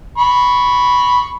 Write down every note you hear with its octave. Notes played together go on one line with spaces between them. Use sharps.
B5 C#6